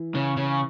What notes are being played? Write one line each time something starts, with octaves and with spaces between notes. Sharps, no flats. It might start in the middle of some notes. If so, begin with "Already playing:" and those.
Already playing: E3 E4
C#3
C#3